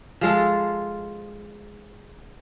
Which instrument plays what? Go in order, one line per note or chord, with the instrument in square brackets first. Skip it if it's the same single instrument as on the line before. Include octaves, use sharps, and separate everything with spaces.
[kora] F3 G#3 F4 A4